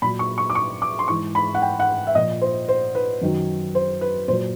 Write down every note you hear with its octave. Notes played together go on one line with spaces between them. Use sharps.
A#2 F#3 B5
C#6
C#6
D6
C#6
D6
C6
G#2 E3 C#6
B5
F#5
G5
F#5
E5
A#2 F3 D#5
C5
C5
B4
F#2 D#3 F#3
C5
B4
A#2 F#3 C5